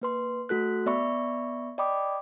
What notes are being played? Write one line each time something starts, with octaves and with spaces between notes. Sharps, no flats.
A#3 B4 C6
A3 F#4 A4 F#6
B3 D5 E5 B5 C#6
D5 D#5 G5 B5 D6 D#6